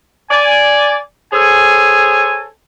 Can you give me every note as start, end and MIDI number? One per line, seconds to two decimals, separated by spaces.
0.31 0.97 74
0.31 0.97 80
1.33 2.46 68
1.33 2.46 69
1.33 2.46 72
1.33 2.46 73
1.33 2.46 80